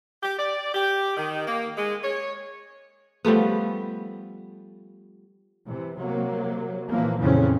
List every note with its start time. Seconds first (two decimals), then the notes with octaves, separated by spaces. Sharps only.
0.23 G4
0.39 D5
0.75 G4
1.17 D#3
1.48 A#3
1.78 G#3
2.04 C#5
3.25 F3 G3 A3 B3
5.68 C3 E3
5.98 C3 F#3 A#3
6.91 A#2 E3 F3 A#3
7.20 F2 A#2 C#3 E3 C4 C#4